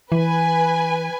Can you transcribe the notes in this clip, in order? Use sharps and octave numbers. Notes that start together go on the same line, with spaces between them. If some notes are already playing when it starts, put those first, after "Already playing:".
E3 B4 G#5